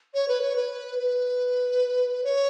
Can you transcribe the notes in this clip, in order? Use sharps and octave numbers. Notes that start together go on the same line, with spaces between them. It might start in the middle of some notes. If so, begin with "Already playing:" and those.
C#5
B4
C#5
B4
B4
C#5